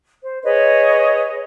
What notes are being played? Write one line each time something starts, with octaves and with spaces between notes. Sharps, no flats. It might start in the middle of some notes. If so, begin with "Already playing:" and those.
C5
G#4 B4 C#5 D#5